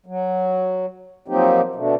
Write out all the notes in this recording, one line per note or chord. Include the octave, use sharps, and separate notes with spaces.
F#3
F3 F#3 A#3 C4 D#4 G4
B2 D3 A3